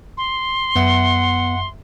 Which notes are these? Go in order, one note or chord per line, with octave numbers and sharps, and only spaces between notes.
C6
F#2 B3 E5 F#5